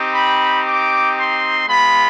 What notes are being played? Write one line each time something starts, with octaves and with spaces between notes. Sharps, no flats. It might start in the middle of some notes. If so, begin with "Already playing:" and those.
Already playing: C4 D#4 G4
B5
D6
C6
G#3 B3 F4 B5